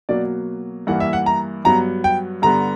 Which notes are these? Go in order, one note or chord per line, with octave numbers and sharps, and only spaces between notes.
B2 F#3 A#3 D5
G2 E3 A#3 F#5
E5
F#5
A#5
G2 F#3 B3 A#5
G5
G2 D3 G3 B3 A#5